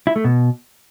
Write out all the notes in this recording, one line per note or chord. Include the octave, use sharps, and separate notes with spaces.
E4
A3
B2